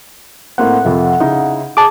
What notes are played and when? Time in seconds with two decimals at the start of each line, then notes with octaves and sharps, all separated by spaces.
0.58 A2 A#3 C4 F#5
0.85 F2 C3 F3
1.20 C#3 D#4 E4
1.77 G#4 A5 D6